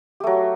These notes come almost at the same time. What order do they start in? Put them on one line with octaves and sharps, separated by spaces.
G4 A3 F#3